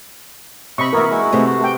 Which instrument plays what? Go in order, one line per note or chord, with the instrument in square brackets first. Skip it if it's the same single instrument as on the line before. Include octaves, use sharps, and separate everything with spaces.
[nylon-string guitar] C3 [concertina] D#5 E5 [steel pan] B5 C#6
[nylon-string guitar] E3 A#3 [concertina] B3 E4 F#4 [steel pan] A#4 E5
[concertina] G#3 E4 F#4
[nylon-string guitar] C3 A3 B3
[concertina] F#4
[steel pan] A4 G5